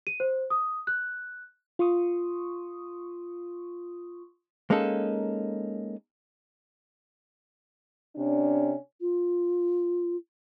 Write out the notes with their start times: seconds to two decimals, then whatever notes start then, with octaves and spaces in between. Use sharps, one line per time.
0.07 D#7
0.20 C5
0.50 D#6
0.87 F#6
1.79 F4 C6 C#6 D#6
4.70 G#3 A#3 C#4 D#4 A4
8.16 C3 C#4 D4
9.01 F4